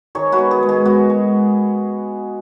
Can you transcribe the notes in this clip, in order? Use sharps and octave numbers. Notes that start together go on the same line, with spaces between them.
D#3 G#4 C#5
F#4 B4
B3
G#4
G#3
G#4
B3 F#4
G#3